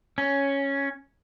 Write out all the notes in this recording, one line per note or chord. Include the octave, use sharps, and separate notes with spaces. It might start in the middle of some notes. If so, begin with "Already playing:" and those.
C#4